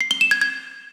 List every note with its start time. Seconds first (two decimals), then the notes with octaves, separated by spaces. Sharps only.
0.01 C7
0.11 G7
0.21 E7
0.31 G#6
0.41 G#6